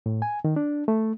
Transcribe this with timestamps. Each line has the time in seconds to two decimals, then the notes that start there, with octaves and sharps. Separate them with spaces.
0.06 A2
0.22 G#5
0.45 D#3
0.56 D4
0.88 A3